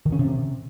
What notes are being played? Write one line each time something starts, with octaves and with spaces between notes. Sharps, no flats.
D#3
C#4
C3